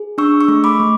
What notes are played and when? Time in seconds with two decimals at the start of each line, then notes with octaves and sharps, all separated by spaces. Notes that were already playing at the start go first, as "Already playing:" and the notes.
Already playing: G#4
0.18 D4 C#6 E6
0.41 C#6 E6
0.48 A3
0.64 B5 D6
0.80 A3